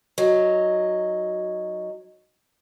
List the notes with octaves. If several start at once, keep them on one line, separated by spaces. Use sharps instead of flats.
F#3 D#4